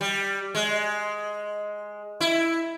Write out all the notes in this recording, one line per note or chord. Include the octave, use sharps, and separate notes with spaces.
G3
G#3
E4